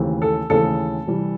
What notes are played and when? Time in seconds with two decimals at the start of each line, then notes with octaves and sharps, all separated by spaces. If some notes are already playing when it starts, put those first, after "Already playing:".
Already playing: D#2 C#3 E3 A3 C4
0.22 A4
0.50 D#2 C#3 E3 A3 C4 A4
1.07 C3 E3 G3